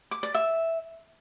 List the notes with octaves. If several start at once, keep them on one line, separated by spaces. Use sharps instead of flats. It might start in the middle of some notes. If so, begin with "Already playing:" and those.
D6
D5
E5